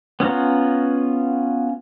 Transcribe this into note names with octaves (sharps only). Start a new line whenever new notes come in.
B3 C#4 F4 F#5 A#5